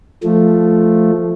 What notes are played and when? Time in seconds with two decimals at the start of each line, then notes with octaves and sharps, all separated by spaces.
0.24 F3 A3